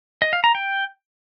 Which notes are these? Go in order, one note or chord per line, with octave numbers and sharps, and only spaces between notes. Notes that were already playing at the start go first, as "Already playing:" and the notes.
D#5
F5
A#5
G5